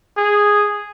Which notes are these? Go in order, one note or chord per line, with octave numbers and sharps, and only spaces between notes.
G#4